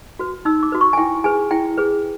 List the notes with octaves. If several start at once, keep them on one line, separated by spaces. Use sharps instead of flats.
F#4 B4
D#4 E6
D6
F#4 B4
C#6
G#5
E4 G5
G#4 B4 G#5
E4 G5
G#4 B4